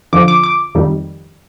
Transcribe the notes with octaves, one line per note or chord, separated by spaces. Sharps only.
F2 D3 F3 D6
D6
D6
F2 D#3 G3